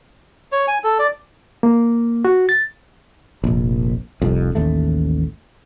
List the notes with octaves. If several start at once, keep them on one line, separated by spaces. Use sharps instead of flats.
C#5
G#5
A4
D5
A#3
F#4
A6
F1 A#1
F1 C2 F2
A1 D#2 A3